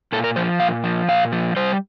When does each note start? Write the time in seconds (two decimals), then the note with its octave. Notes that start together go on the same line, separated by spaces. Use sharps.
0.12 A#2 A4
0.24 A#4
0.36 F3 C5
0.60 A#2 F5
0.84 F3
1.09 A#2 F5
1.33 F3
1.56 G3 C5